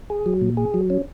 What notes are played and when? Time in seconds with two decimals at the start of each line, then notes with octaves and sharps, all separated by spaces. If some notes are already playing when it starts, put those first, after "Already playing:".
0.10 G#4
0.26 F#3
0.41 A#2
0.57 G#4
0.74 F#3
0.90 C#4